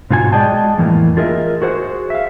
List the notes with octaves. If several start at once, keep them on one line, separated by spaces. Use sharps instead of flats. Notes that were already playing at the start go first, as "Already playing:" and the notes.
G#2 B2 F4 F#4 G#5
G#3 G#4 D5 D#5 G5 A5
F2 A2 E3 A#3
F4 G#4 A#4 D#5 E5
F#4 G#4 C5 F#5
E5 F5